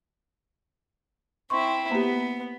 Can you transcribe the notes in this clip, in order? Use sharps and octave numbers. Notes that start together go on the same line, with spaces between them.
C4 E4 C6 C#6
A#3 B3 G4